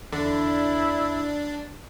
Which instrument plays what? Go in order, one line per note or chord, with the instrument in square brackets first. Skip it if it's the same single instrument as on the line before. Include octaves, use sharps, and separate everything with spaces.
[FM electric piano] E2 [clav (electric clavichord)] D3 [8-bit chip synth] D4 [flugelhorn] E4